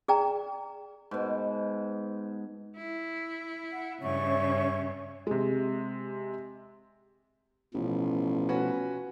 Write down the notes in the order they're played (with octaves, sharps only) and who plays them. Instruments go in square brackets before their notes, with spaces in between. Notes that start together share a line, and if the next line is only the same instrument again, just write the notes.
[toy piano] G#4 D5 G5 A#5
[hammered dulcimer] G#2 B2
[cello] E4
[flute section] F#5
[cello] G2 C#3 [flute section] C#5 E5 C#6
[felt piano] C3 G#3
[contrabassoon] A1 [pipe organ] B2 F3
[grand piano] C#4 F#4 B4